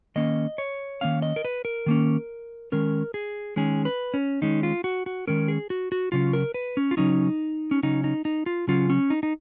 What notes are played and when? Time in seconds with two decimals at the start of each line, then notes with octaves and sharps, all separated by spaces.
0.16 D#3 A#3 C#4 D#5
0.58 C#5
1.01 D#3 A#3 C#4 F5
1.22 D#5
1.36 A#4
1.45 B4
1.65 A#4
1.86 D#3 A#3 C#4
2.72 D#3 G#3 C#4 A#4
3.14 G#4
3.56 D#3 G#3 C#4 G#4
3.85 B4
4.14 C#4
4.42 D#3 G#3 C#4 D#4
4.63 F4
4.84 F#4
5.06 F#4
5.27 D#3 G#3 C#4 A#4
5.48 G#4
5.70 F#4
5.92 F#4
6.12 C#3 F#3 C#4 F4
6.33 A#4
6.54 B4
6.77 C#4
6.91 F4
6.97 C#3 F#3 C#4 D#4
7.71 C#4
7.83 C#3 F#3 C#4 D#4
8.04 D#4
8.25 D#4
8.46 F4
8.67 C#3 F#3 C#4 F4
8.90 C#4
9.10 D#4
9.23 D#4